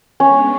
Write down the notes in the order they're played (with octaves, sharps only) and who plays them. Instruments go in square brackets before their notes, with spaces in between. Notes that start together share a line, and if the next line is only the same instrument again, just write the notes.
[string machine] G#3 B3 D4 [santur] C#4